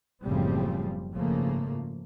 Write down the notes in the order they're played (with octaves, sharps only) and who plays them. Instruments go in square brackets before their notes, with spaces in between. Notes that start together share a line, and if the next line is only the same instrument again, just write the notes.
[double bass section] F#1 A2 C#3 F3 G3 C4
G#1 C#3 F3 A3 A#3